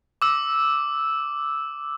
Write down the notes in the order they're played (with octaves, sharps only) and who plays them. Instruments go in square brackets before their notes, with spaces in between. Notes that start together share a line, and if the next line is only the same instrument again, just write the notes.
[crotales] D6 E6